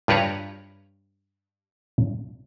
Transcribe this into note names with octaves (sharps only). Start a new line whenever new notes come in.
G2 F4 G4 B4 C#5 A#5